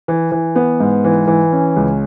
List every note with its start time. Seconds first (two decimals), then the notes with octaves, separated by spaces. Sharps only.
0.08 E3
0.32 E3
0.56 B3
0.80 G#2
1.04 E3
1.27 E3
1.53 C#4
1.76 C#2